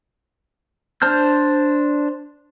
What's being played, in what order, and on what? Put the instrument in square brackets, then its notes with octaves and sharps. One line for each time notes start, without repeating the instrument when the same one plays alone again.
[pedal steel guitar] D4 C5 A5 F6 G6